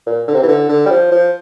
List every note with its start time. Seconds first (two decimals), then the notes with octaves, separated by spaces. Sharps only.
0.06 A#2
0.28 D3
0.34 C3
0.42 E3
0.48 D3
0.69 D3
0.86 G3
0.90 F3
1.11 F3